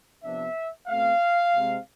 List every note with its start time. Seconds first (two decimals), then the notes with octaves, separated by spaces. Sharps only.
0.23 C3 F3 B3 D4 E5
0.88 B2 A3 C4 F5
1.55 C3 G#3 C4